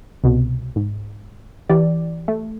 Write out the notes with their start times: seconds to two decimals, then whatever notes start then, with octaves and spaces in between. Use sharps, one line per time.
0.23 C2 B2
0.76 G#2
1.69 E3 G4 D5
2.28 A3